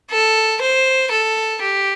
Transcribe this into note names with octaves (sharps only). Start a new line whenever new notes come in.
A4
C5
A4
G4